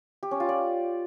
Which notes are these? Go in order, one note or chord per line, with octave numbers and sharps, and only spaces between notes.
G4
C#4
F4
D5